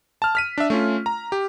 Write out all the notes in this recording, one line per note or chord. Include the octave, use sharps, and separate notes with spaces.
A5 F6
F6 B6 D#7
D4 E5
A3 C#4 F4
A#5
G4